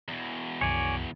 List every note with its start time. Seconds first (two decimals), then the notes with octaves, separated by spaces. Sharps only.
0.08 E2 B2
0.61 C2 F#2 D#3 C#5 D5 G#5